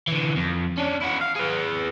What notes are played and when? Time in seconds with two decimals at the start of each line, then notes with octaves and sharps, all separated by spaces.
0.08 D3 E3
0.36 F2
0.77 C#4 D4
1.01 E4 F#4
1.21 F5
1.35 G#4 B4